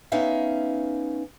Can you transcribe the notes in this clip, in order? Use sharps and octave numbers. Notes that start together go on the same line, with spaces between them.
B3 C#4 D#4 E5 F5